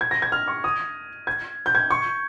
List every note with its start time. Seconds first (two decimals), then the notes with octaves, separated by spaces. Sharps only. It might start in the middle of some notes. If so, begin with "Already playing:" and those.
0.01 G#6
0.11 A#6
0.22 G#6
0.32 F6
0.48 C#6
0.64 D#6
1.27 G#6
1.66 G6
1.75 G#6
1.91 C#6